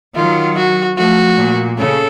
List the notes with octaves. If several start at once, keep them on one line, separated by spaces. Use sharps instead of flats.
D#3 F#3 F4
F#4
F3 A3 F#4
A#2
C#3 A4